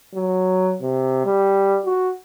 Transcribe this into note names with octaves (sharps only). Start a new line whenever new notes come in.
F#3
C3
G3
F#4